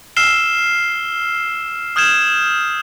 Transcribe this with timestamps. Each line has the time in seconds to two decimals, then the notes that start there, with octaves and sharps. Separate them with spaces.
0.16 E6 F6 C7 E7 G7
1.96 D#6 F6 G6 G#6 E7